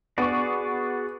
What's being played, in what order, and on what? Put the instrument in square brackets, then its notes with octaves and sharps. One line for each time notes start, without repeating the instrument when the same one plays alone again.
[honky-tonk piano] B3 C#6 [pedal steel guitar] F#4 G#4 D5